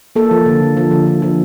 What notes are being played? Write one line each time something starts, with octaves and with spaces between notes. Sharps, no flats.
A#3 A4
F3
D3
F3
F3
D3
D3
F3